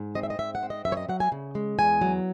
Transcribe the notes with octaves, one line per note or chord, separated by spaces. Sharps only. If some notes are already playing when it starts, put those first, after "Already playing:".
Already playing: G#2
C4 D#5
E5
D#5
G#2 E5
F#5
C4
D#5
F#2 E5
C#5
D#5
F#3 F#5
G#5
C#3
G#3
E2 G#5
F#3